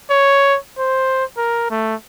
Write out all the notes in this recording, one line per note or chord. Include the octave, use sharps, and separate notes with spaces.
C#5
C5
A#4
A3